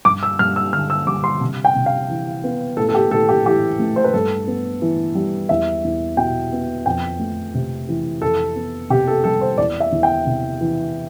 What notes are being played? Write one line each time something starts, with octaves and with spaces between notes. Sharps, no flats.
G2 D6
E6
G2 F6
E6
D3 F6
E6
G3 D6
C6
C3
G5
C3
F5
E3
B3
A2 A4
A4
G4
A2 A4
G4
E3 G4
A3
C5
B4
G2 A4
B3
E3
G3
E2 E5
E2
B2 G5
B3
F2 G5
A3
C3
E3
F2 A4
B3
C3 G4
A4
G3 A4
C5
E2 D5
E5
E2
G5
C3
E3